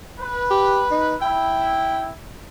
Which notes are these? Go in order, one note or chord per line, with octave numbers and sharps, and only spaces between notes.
B4
G4
D#4
E4 G5